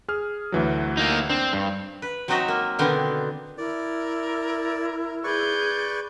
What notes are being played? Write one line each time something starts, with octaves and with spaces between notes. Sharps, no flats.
G#4 F6
D2 E3 F#3
A#3 D#4
C4 D4
G2
B4
F#3 C4 D#4 F#4 D#5 E5
A#3
B2 D3 D#3 B3 C4 D4
E4 A#4 D5
G#4 B4 D5 C#6 G6 G#6